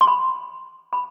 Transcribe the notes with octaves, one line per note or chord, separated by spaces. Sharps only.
C6
B5
B5